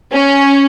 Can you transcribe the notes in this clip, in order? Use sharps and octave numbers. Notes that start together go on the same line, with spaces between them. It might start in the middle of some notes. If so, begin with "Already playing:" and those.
C#4